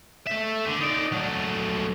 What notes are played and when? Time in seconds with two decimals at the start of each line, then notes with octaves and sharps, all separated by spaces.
0.27 A3 E5
0.66 D3
0.81 D#4 D5
1.12 F#3 A3